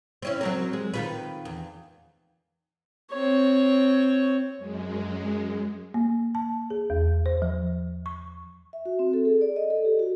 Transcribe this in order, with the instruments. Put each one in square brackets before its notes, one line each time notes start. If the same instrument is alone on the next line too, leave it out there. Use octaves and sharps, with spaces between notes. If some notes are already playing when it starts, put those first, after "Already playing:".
[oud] C4 C#4 E4
F#3 C4 A#4
G#3
D#3 F4 B4
E2
[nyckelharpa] C4 C#5
[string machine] F#2 G#3
[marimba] A#3
A5
G#4
E2
C5
F3
C#6
[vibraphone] E5
F#4
C4
A4
G#4
D5
D#5
A4
G4
F#4